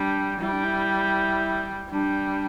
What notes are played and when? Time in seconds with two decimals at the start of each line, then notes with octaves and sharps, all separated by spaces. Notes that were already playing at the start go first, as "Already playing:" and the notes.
Already playing: G3 D4
0.40 G3 E4
0.52 D4
0.64 E4
1.90 G3 D4